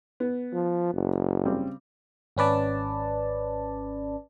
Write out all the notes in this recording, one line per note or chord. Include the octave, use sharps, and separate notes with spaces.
B3
F3
F#1
C#3 G3 C4
G#1 C#4 B4 D5 A5